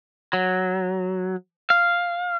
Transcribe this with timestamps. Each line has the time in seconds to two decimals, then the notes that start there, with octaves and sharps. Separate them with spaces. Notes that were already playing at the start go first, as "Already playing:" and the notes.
0.33 F#3
1.70 F5